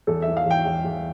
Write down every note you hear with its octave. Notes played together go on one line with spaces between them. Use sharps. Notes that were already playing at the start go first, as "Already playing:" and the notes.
E2 A4
E3 E5
F5
E2 G5
E2
E2